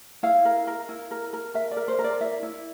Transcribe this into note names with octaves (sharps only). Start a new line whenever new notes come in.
E4 F5
A#4
A#4
E4
A#4
A#4
A#4 E5
D5
A#4
C5
A#4
D5
E4 E5
E4